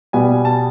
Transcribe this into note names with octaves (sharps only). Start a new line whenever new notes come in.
B2 G3 B3 G#5
A5